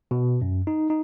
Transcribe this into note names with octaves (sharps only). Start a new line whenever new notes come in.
B2
F#2
D#4
D#4